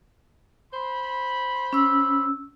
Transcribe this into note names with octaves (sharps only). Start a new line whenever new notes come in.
C5 B5
C#4 E6